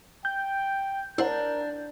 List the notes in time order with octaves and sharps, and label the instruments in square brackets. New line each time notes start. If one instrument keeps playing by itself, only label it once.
[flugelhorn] G5 [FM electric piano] G6
[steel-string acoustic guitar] D4 [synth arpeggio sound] E4 C5 F#5 [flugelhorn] A#4